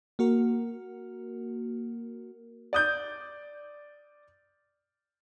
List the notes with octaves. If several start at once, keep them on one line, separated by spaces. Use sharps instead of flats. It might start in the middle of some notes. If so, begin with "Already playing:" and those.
A#3 F#4 A#4
D5 D#6 G6